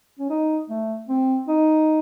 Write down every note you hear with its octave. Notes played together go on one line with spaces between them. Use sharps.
C#4
D#4
A3
C4
D#4